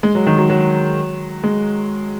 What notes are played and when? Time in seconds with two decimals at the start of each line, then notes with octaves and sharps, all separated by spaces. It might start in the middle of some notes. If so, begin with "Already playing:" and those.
0.03 G#3
0.15 F#3
0.27 D#3
0.38 F#3
0.50 F#3
1.44 G#3